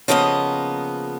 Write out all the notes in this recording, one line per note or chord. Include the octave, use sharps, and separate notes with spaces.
C#3 F3 A#3 B3 B4 D#5